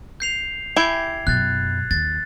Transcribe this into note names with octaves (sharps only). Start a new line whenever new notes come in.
G6 C7 F7
E4 G4 G#5 G#6 C7
F#2 B2 F#6 A6
D#2 D#3 A6